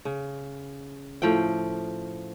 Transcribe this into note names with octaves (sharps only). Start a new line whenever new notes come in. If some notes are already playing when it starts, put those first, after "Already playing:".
C#3
A2 F3 G5